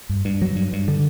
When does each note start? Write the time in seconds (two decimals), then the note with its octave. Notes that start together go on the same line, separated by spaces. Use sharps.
0.09 G2
0.25 G2
0.42 F#3
0.56 G2
0.73 G2
0.88 D3